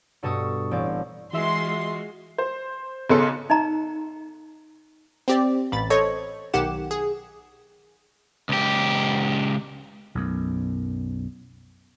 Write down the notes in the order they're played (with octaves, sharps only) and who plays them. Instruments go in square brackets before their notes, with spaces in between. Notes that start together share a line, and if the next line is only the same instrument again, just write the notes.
[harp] G2 B2 A4 C#6 D#6
A1 C4 D5
[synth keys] E3 E5 [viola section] G#3 F4 F#4 [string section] C6
[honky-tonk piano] C5
B1 C#3 C#4 A4 C6 C#7
[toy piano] D#4 D#5 A#5
[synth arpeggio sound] C4 G4 D5
A1 B5 A6
A4 C5 C#5 D#5 C#6
B1 D#3 G4 F#5 E7
G#4
[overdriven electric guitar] C#2 G4
[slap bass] B1 F#2